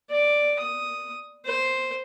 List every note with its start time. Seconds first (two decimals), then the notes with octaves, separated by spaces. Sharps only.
0.10 D5
0.60 D#6
1.46 C5